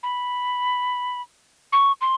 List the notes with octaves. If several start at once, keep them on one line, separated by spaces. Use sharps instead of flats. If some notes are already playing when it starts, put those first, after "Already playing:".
B5
C#6
C6